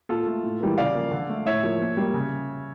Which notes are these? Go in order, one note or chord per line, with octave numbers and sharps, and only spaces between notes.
A#2 F4 A4
A3
A2
E3 G3 A#3
C#3 D5 F5
F3 A#3
D3
A3
A2 C#5 E5
F3 A#3
A#2
G3 A#3
C#3